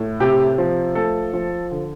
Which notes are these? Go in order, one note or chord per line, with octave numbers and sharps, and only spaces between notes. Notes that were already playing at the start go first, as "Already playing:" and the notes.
Already playing: A2
C3 G4
F3
A3 A4
F3
D3